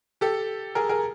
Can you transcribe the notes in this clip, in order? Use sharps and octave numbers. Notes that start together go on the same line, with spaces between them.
G4 A4
G#4 A#4
G#4 A#4